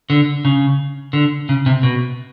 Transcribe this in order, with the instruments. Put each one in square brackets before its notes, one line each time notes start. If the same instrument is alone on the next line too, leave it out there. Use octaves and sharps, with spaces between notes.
[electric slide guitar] D3
C#3
D3
C#3
C3
B2